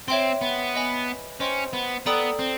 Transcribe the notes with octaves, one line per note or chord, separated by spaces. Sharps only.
C4 C#5 E5 G5 C6
B3
B4 D#5 G#5 B5
C#4 C5 D#5 G5 C6
B3
B3 A4 D5 G5 A#5 D#6
C4